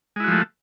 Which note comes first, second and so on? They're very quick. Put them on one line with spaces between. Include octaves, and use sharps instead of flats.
G#3 E4 F#4 F3 A3